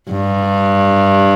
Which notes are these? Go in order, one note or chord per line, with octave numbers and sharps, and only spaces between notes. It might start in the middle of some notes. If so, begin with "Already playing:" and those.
G2